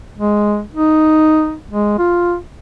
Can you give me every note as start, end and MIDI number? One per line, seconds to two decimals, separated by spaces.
0.18 0.61 56
0.74 1.55 63
1.71 1.94 56
1.99 2.35 65